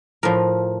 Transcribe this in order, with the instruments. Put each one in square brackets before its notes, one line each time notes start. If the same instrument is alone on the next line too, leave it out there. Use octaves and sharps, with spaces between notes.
[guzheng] A2 F3 A#4